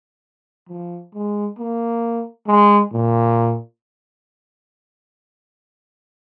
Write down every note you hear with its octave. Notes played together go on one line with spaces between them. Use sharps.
F3
G#3
A#3
G#3
A#2